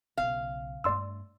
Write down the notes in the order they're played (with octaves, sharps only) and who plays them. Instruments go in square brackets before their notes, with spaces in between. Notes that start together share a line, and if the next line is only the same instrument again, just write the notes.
[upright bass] B1 C#3 [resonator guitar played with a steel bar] F5
[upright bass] G2 A3 [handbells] D5 C6 E6